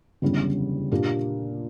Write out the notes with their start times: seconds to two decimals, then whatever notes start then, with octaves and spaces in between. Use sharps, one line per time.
0.22 F#1 E2 D3 G3 C#4
0.92 A#2 A#3 D4 G4